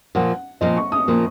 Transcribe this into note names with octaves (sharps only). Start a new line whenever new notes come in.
A#2 F3 A#3 F#5
A#2 F3 A#3 D#5
C#6
D#6
A#2 F3 A#3